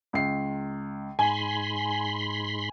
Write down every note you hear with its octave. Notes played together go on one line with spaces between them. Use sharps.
C#2 C7
G#2 G#5 B5 C6